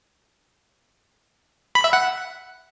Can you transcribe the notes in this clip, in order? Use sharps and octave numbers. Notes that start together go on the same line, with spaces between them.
B5
E5
F#5